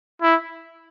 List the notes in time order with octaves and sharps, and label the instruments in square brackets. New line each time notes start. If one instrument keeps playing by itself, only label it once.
[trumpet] E4